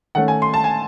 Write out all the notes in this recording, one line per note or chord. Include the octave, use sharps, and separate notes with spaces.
D#3 A3 C#4 F#5
G#5
C6
A5
G#5